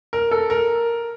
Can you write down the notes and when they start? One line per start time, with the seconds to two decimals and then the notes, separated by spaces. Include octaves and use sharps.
0.13 A#4
0.31 A4
0.50 A#4